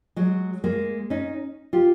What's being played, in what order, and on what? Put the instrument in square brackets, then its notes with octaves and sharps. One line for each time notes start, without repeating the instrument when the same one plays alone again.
[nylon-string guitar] F#3 G#3
G#3 A#3
C#4 D#4
F4 G4